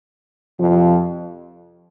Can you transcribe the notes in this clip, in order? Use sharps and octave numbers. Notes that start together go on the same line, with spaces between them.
F2 C3 F3